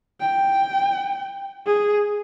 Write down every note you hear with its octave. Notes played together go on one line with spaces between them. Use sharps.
G5
G#4